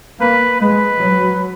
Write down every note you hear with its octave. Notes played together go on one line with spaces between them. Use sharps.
A#3 B4
G#3 B4
F#3